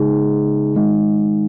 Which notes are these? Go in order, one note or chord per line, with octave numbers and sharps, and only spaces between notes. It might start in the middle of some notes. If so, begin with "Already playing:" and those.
Already playing: C#3 G#3 D#4 G#4
D#3 G#3 D#4